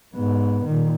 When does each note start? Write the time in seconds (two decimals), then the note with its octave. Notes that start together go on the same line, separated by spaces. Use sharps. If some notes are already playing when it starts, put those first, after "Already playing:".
0.14 G#2 B3
0.65 A#2 D#3